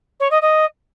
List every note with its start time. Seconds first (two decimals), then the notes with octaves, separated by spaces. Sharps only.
0.20 C#5
0.31 D#5
0.42 D#5